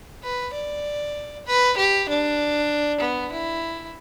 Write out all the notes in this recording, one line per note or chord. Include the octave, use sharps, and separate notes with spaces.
B4
D5
B4
G4
D4
B3
E4